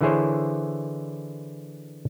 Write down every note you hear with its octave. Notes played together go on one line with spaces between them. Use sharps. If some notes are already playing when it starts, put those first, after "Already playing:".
D3 E3 E4 G#4 C5 C#5